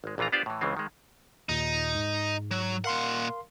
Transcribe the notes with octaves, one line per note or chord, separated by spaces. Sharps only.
G#1 G#3
A#1 A#2 E3 F4 A#5
B3 D4 F4 G4 C5 D5
A2 E3
C#2 C#3 E3 G#3 C4
D#3 G#3
D#2 A#2 D#4
G#2
F#3
A#2 A#4 F5 F#5 C6